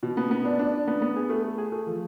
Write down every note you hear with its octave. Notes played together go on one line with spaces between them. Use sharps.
B2
B3
B3
D4
D4
D4
B3
B3
G#4
A3
A3
G#4
A3
F3